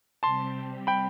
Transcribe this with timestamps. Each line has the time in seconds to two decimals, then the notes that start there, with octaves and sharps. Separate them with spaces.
0.22 C3 G3 C4 G4 A5 C6
0.87 G5 B5